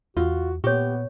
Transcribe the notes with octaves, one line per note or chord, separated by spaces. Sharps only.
E2 F4 F#4
A#2 B3 G4 C#5 C#6